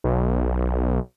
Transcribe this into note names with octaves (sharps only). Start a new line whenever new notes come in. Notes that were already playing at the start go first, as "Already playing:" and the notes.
B1